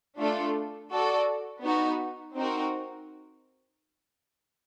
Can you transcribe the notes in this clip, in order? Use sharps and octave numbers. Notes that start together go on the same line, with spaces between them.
A3 D4 F4 A4
F#4 A4 D5
B3 D#4 F#4
C4 D#4 F#4 A#4